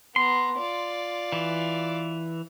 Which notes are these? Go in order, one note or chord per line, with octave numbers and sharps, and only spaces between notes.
B3 A#5 C6
F4 D5
E3